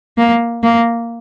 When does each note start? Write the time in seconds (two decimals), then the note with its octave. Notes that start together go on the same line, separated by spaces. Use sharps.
0.18 A#3
0.63 A#3